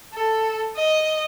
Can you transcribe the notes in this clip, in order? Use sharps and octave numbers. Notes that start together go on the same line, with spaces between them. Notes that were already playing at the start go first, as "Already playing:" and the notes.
A4
D#5